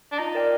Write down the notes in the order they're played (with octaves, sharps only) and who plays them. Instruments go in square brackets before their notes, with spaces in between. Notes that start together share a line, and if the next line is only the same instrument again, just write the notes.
[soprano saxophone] D4
[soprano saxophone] D#4 [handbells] F4
[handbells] A#4 D5 G5